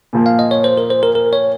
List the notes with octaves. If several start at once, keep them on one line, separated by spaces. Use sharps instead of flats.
A#2 F3 A#3
F5
D#5
C#5
C5
A#4
C5
A#4
A#4
C#5